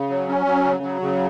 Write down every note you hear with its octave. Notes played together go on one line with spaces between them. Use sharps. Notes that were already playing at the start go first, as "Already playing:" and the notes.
Already playing: C#3
F#3
C#4
F#3
C#3
F#3
C#3